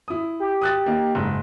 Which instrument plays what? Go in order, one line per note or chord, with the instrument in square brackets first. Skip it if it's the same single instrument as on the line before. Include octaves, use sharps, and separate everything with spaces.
[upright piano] E4 D#6
[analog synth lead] G4
[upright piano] D#6 F#6 A6
A#3 D#4 F5
F#1 G#2